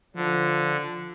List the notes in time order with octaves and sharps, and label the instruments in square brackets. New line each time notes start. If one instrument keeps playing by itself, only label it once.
[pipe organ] D3 [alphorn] F3